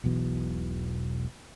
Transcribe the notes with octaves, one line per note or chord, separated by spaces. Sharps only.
E1 B1 E2 B2